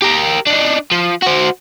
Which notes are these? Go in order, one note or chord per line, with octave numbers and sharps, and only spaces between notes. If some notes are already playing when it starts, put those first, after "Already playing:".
G4 A#4
D4 D#4
F3
F#4 C5